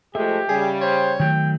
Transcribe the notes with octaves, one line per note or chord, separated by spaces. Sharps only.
F3 G#3 A3 G4 E5
C#3 G3 G#4
C5 C#5
D#3 F#3 A3 G5